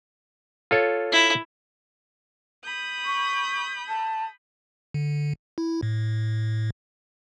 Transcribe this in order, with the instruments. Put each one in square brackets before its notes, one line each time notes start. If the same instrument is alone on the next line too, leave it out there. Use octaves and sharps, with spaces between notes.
[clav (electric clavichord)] F4 A4 C#5
[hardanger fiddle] E4
[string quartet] B5 D#6 G6
[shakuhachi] C#6
A5
[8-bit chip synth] D3
E4
A2